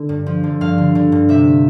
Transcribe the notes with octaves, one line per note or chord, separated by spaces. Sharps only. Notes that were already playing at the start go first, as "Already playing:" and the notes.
Already playing: D3
G2
F3
D3
G2 F5
D3
D3
G2
C3 E5